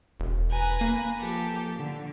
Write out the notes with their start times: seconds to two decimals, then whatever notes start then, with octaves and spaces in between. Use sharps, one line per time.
0.20 E1
0.50 B4 G#5 A#5
0.81 A#3
1.20 F3 G4 A4
1.76 D3